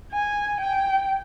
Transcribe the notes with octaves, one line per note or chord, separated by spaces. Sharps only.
G#5
G5